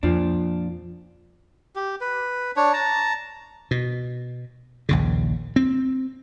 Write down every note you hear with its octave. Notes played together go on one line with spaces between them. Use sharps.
F2 A#2 F3 D4
G4
B4
D4 C#5
A5 A#5
B2
A#1 D#2 C#3
C4